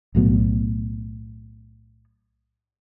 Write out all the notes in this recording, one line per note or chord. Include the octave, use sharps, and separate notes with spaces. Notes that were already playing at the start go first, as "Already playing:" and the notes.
B1 A2 F#3 B3